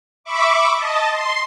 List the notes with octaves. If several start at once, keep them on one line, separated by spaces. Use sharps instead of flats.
E5 B5 C#6 D6
D#5 A5
C6